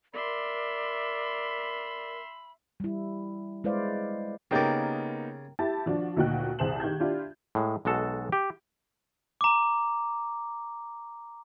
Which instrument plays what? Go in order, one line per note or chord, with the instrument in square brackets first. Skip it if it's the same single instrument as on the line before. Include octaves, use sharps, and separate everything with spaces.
[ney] A#4 [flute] D5 [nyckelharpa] E5 C6 [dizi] B5
[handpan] G3 E4
G#3 E4 B4 C5 D5 F5
[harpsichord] C#3 D5 [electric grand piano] A#3 B3 D#4 [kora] G4 A#4
[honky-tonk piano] E4 G4 A5 A6
F3 D4 F#4
D2 A#2 D#4 F#4 G5 F#6
C2 G#4 C5 A5 E7 F#7
D#3 G4 G6 G#6
D4 E4 F4 G4
[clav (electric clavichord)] A2 G#3
B1 G#3 F#4 A4 A5
G4
[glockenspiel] A#5 D6